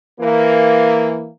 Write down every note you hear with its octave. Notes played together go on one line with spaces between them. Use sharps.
E3 A#3